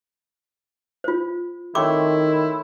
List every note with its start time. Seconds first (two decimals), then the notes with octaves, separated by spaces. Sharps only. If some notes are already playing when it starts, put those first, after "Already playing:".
1.04 F4 C5
1.75 D#3 A3 C4 E4 C#5 C#6 D6